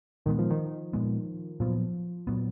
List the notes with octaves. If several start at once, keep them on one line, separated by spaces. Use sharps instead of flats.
A#2 D#3 G#3 B3
F3
D#3
A#2 G#3 B3
A#2 F3 F#3 B3
A#2 F#3 B3